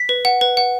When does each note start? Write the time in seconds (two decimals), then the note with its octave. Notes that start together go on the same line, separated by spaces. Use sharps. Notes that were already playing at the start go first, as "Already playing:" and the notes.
Already playing: B6
0.09 B4
0.25 F#5
0.41 B4
0.57 F#5